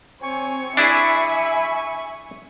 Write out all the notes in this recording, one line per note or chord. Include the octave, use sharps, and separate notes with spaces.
C4 C#5 G#5 C#6
D4 E4 G#4 E5 G#5 B5